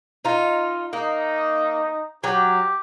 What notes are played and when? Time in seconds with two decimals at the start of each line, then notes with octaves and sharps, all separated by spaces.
0.25 D#4 F4
0.93 A#3 D#4
2.24 F#3 G4